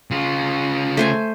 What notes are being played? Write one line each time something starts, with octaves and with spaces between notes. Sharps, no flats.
C#3 F4
A3 C5 G#5